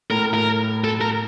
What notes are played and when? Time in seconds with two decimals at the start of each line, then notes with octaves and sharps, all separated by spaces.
0.11 A2 A#4
0.34 A#4
0.84 A4
1.01 A#4